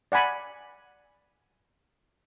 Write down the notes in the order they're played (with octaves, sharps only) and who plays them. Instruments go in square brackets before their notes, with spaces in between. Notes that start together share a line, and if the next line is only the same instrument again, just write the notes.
[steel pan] D5 F#5 G#5 B5